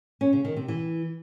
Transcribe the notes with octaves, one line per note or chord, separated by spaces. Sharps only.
C#4
C#3
D#3
C3
E3